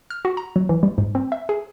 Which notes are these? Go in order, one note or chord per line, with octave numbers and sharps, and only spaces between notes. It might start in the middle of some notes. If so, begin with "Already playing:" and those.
F6
F#4
A#5
F#3
E3
G3
G#2
C4
E5
G#4